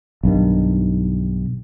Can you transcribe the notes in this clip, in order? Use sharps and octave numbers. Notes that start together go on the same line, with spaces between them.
B1 G2 D#3